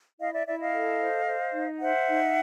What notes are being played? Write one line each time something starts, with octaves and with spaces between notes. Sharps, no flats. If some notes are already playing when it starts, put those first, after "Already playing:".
E4 D#5 F5
D5 E5
E4 D5 E5
D#5 F5
A4
C5
C5
D#4
C5 E5 F#5
D#4